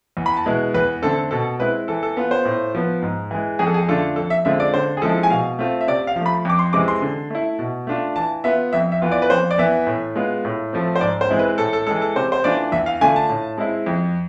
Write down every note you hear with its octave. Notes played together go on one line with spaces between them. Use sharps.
E2
B5
A5
B2 G#3 B3 E4
E2 B4
D3 A3 C4 A4
B2 A4
G#3 C4 E4 B4
E3 A4
A4
B3 F4
C5
A2
F3 B3
G#2
E3 G#3
F2 G#4
A4
G#4
D3 A3 D4 F4 A4
F2 A4
E5
D3 G#3 C4 F4 E5
D5
D3 C5
G#4
F3 G#3 C4 E4 A4
G#5
B2 F5
A3 C4 F4
E5
C3 D5
F5
F3 A3
B5
F2 D6
C6
C3 E3 G#3 C4 D6
C6
D3
A3 E4
B2
A3 D4 F4
E3 A5
B3 F4 E5
F2 E5
E5
E3 B3 F4
D5
B4
F2 C5
D5
E3 B3 E5
A2
G#3 B3 F4
A2
F3 A3 C4
C5
G#2 D5
C5
E3 G#3 C4 E4
B4
A2 A4
A4
E3 G#3 A4
A4
C3 C5
C5
E3 A3 D4 F4 D5
E2 E5
F5
D3 A3 D4 F4 G#5
A5
A2
G#3 C4 E4
F2